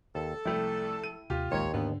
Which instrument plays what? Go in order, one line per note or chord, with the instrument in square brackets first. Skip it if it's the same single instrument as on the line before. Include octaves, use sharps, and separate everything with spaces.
[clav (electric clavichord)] D#2 [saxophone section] A4
[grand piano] C2 A3 [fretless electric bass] F3 [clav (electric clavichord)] E4 G5
[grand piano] D#7
[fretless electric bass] D#2 C3 [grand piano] F4 G4
[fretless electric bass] D1 A1 G#3 [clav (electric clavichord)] D#2 [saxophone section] D#4 C5 C#5
[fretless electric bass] G#2 [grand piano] D3 [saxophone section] D#3 A#3 B3